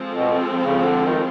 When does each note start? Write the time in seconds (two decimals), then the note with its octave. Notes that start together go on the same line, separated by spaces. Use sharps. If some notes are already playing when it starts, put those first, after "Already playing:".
Already playing: F3 G#3 C4 F4 A4
0.16 B2
0.61 C#3
0.84 D3
1.07 D#3